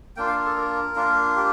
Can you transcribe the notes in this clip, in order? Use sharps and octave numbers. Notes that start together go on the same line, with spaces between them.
A#3 D4 F4 G5
F5
A4
A#4
A#3 D4 F4
G4